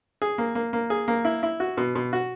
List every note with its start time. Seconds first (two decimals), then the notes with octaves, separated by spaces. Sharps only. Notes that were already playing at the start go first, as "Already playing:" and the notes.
0.22 G#4
0.38 A#3
0.55 A#3
0.73 A#3
0.90 G#4
1.08 A#3
1.25 E4
1.43 E4
1.60 F#4
1.77 B2
1.95 B2
2.13 F#4